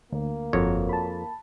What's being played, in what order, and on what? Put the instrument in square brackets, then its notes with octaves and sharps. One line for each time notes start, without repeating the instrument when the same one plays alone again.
[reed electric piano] D2 [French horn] A#3
[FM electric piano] G1 [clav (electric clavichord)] F2 [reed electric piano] F#4 A#4 C#5
[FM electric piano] A5 B5